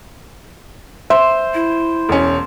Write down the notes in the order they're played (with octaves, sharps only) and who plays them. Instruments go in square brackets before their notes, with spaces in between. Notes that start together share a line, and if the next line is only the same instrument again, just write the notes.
[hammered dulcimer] C5 [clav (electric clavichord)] E5
[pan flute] E4
[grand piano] E1 C#4